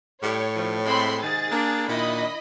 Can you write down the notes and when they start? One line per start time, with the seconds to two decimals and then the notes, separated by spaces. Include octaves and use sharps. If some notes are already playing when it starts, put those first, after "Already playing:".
0.23 A2 G3 G4 C#5
0.56 G2 B2 F3
0.86 G#3 A3 C4 B5 C6
1.23 G#2 C3 D#3 G#4 A6
1.52 A#3 D4
1.88 A#2 D#3 D4 E4 D#5 B5